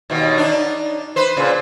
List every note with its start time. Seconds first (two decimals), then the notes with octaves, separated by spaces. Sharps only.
0.10 D#2 B2
0.37 D4 D#4
1.16 B4 C5
1.37 A#2 C#3